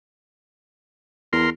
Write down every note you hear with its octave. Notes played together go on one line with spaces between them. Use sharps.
E2 A#4 C6